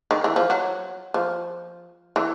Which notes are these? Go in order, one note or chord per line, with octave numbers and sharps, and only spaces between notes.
D#3
E3
F3
F#3
F3
E3